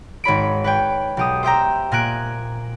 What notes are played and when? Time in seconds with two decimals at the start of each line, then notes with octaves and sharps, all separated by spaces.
0.24 G#1 C#5 B5 D7
0.64 B4 C#5 G5
1.17 B1 G4 D#6
1.43 C5 E5 G5 A#5
1.92 A#2 A#4 G#5 F#6 D7